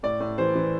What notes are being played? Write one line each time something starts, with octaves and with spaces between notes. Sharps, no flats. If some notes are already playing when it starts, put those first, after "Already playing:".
A2 D5
A2
E3 C5
E3